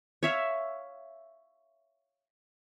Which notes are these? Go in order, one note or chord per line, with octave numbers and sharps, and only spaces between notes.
C#5 E5 F5